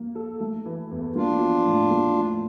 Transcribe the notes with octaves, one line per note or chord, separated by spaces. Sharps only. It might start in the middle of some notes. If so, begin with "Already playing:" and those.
Already playing: A#3
A4
A3
E3
E2
A#3 D4 F4
F3
A2
A#3
F3